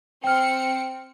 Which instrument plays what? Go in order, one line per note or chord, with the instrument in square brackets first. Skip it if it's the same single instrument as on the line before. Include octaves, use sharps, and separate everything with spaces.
[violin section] C4 C#7 [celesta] G5 F6